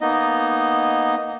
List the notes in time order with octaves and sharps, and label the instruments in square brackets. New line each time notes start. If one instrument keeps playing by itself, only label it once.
[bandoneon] A#3 B3 D#4 D#5